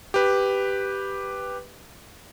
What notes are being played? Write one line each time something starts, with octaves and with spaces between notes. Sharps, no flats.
G4 B4